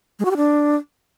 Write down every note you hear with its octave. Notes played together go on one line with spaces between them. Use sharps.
G#3
F#4
G4
D4